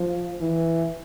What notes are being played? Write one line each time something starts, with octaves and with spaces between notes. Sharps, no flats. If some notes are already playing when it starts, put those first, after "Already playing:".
Already playing: F3
E3